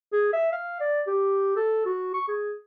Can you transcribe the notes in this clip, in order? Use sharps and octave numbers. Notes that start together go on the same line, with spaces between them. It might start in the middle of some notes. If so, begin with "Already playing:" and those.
G#4
E5
F5
D5
G4
A4
F#4
C#6
G#4